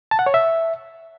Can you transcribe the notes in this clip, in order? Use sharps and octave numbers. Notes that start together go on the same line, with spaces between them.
A5
F#5
C#5
E5